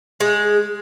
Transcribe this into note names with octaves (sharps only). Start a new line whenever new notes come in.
G#3